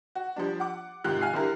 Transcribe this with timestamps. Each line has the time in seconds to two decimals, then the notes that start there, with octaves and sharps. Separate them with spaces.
0.15 F#4
0.36 F3 G3 D4
0.60 F#5 D6
1.04 G#2 C3 D#3 F4 G4 F#6
1.21 F5 G#5 F6 C7
1.33 D3 G3 E4 G4 A#4